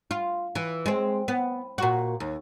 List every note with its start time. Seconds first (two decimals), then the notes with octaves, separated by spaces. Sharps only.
0.11 F4
0.55 E3
0.86 G#3 C4
1.28 B3
1.78 A#2 F#4
2.20 D#2